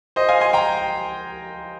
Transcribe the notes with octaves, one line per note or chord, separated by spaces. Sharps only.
C5 D#5
F5 G#5
G#5 C6
G5 A#5